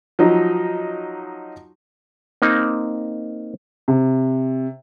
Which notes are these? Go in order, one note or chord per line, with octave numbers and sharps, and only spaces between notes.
F3 F#3 D#4
A#3 C4 D#4
C3